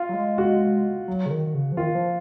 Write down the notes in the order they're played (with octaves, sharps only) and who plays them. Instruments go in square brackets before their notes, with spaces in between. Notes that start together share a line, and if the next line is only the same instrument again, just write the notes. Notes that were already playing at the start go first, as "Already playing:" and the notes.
Already playing: [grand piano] F4
[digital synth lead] F#3
G#3
[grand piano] F#4
[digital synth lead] F#3
C#3
D#3
D#3
C#3
F3
[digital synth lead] D#3 [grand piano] F4
[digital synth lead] F3